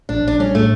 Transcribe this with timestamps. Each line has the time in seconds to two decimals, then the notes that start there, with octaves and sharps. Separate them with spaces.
0.09 A#1 D4
0.25 A#1 D4
0.40 G3 C#4
0.55 A2 A3